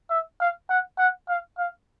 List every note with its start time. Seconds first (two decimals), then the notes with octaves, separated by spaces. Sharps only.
0.10 E5
0.40 F5
0.69 F#5
0.98 F#5
1.28 F5
1.58 F5